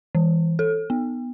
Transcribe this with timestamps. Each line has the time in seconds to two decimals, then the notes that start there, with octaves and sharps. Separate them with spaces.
0.15 E3
0.59 A4
0.90 B3